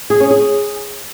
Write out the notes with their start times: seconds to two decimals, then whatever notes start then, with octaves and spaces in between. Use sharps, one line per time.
0.10 G#4
0.20 C#4
0.31 G#4